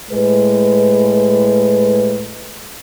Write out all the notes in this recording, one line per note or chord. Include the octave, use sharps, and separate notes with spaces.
A2 G#3 B4